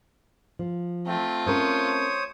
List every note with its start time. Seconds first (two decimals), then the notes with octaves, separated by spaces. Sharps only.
0.59 F3
1.07 A3 C4 F4
1.47 C4 C#4 A#4 C5 C#5 D#6